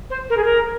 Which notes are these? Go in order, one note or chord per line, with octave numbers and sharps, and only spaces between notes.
C5
A#4
G#4
A#4